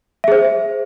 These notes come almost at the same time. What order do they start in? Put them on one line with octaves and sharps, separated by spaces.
E5 G#4 C5